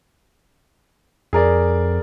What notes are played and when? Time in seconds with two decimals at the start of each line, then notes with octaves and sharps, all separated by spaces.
1.33 F2 G#4 A#4 D5